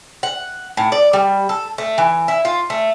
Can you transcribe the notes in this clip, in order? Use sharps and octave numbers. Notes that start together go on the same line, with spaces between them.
F#5
A2
D5
G3
A4
A3
E3
E4
F4
A3